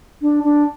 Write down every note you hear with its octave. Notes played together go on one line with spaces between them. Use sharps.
D4
D4